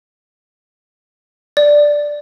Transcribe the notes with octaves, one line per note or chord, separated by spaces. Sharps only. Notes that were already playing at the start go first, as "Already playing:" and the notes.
D5